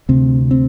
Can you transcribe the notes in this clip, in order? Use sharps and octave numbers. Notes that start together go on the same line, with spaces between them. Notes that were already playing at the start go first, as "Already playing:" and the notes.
D2 C3 C4
C4